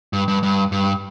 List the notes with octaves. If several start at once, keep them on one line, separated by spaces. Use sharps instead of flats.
G2
G2
G2
G2